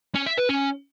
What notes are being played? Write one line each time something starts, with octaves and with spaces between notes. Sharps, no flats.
C#4
E5
B4
C#4